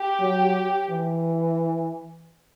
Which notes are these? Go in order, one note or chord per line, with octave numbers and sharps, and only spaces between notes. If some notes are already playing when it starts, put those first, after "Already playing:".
Already playing: G4
F#3
E3